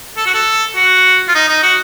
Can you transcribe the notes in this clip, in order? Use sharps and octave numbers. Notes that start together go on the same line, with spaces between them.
A4
F#4
A4
F#4
F4
D#4
D#4
F#4